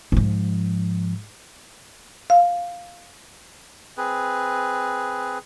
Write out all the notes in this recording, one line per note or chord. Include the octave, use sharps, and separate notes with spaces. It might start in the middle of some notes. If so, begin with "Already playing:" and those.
G#2 F3
F5
C4 G#4 B4